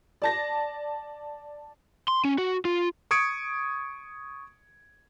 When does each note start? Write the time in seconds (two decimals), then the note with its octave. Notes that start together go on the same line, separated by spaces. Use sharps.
0.22 D5 A5 A#6
2.08 C6
2.25 C#4
2.38 F#4
2.65 F4
3.11 C#6 D#6 G#6 C#7 D7